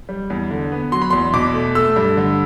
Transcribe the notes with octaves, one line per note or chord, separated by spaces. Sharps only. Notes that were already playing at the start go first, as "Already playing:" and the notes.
G3
E2
D3
B3
F#3 C6
B5
E2 C6
B2 D6
A3
A3 E6
G2
D3